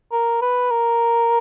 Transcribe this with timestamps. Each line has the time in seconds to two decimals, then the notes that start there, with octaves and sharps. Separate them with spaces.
0.12 A#4
0.42 B4
0.71 A#4